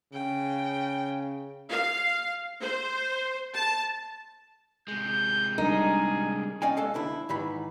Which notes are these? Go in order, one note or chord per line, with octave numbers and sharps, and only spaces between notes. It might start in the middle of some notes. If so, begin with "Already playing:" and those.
C#3 G5
F5
C5
A5
C3 G#3 G6
G3 D4 D#4 G#4 A#4
C#4 D5 D#5 F5 G5 G#5
G#3 A4 F5
D2 D4 E4
G#2 D#3 E3 B5